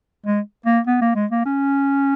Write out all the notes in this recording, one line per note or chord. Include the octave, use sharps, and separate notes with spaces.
G#3
A#3
B3
A#3
G#3
A#3
C#4